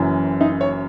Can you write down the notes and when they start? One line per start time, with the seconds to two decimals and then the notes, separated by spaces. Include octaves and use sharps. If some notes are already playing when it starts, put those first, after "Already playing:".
Already playing: F#1 F#2 E3
0.41 D#4
0.61 C#5